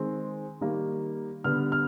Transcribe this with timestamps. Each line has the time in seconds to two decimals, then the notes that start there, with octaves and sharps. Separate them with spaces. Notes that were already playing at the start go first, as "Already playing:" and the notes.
Already playing: D#3 G#3 C4
0.61 D#3 G3 A#3
1.44 D3 G3 B3 F6
1.72 F6